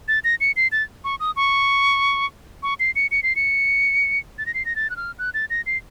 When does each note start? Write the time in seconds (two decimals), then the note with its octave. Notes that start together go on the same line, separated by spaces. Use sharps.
0.08 A6
0.24 A#6
0.41 C#7
0.56 C7
0.72 A6
1.04 C#6
1.20 D#6
1.36 C#6
2.63 C#6
2.80 C7
2.96 C#7
3.11 C#7
3.23 C7
3.36 C#7
4.38 A6
4.46 A#6
4.54 C7
4.65 A#6
4.76 A6
4.90 F#6
4.97 F6
5.19 F#6
5.34 A6
5.50 A#6
5.66 C7